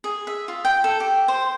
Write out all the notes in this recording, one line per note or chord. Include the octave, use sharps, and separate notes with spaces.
G#4
E5
F4
G5
A4
G4
C5